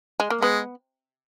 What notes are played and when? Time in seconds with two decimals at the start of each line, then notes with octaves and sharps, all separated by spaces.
0.20 G#3
0.30 A#3
0.41 G#3 B3